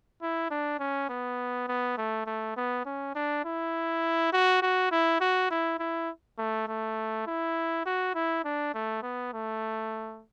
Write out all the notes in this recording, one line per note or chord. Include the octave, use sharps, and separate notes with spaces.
E4
D4
C#4
B3
B3
A3
A3
B3
C#4
D4
E4
F#4
F#4
E4
F#4
E4
E4
A3
A3
E4
F#4
E4
D4
A3
B3
A3